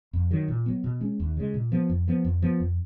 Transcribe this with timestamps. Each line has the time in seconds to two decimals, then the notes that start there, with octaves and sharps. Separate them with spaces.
0.13 F2
0.31 D#3 F#3
0.48 A#2
0.66 F#3 B3
0.84 B2
1.01 G#3 C#4
1.20 D#2
1.37 C#3 G#3
1.54 A#2
1.72 F3 B3
1.90 F2
2.08 F3 B3
2.25 F2
2.42 F3 B3
2.60 F2